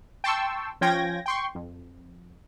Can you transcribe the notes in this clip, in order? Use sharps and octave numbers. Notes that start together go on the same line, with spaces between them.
G5 A5 C6 C#6 E6
F3 C#4 F4 G5 G#6 A#6
G5 C6 C#6
F2